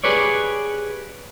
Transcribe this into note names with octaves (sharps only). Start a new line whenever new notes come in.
G4 G#4 B4 C#5 D5